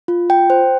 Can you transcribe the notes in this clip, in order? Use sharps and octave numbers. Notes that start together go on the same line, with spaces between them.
F4
G5
C5